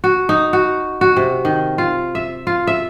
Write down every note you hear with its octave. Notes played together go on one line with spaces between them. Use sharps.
F#4
D#4
F#4
F#4
C3
D#3
F4
E5
F4
E5